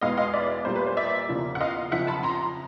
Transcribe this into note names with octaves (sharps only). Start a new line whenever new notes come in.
E2 B2 G#3 B3 D#5 F5
D#5 F5
D5 E5
A#2 G3 A#3 C5
B4
C5
D5 E5
E2 C#3 F3 A#3
F#5
D#5 F5
F2 C#3 F3 E5 F#5
A5 B5
A#5 C6